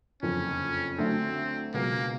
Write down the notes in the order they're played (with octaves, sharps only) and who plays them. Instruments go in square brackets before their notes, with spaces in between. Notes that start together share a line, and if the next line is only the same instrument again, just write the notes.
[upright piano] F#1 F2 D3 [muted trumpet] C#4
[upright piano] D2 D3 F#3 A3 D4 [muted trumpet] C4
[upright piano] C#2 B2 F#3 [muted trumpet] A#3